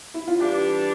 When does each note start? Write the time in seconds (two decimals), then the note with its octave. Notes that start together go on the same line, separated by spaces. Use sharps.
0.14 E4
0.28 F4
0.40 E3 G3 D4 G4